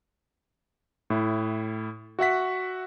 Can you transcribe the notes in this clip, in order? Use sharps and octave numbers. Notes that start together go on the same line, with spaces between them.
A2 E4
F#4 E5 F#5 B6